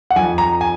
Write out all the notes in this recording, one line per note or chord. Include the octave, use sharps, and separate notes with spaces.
F#5
F2 G#5
A#5
G#5